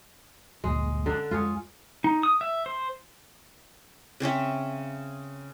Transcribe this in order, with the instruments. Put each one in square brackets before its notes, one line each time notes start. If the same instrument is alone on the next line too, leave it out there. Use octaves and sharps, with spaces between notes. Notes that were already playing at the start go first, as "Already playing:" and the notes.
[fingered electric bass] G1 D2 A#2 [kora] G#3
[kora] D3 D4
[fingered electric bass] F2 G#3 [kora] F4 G#4 C#5
[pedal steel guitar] D#4
D#6
E5
C5
[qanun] C#3 C4 C#4 E5